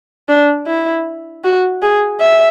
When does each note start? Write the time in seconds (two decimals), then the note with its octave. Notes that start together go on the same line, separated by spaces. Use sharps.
0.29 D4
0.67 E4
1.44 F#4
1.82 G#4
2.21 E5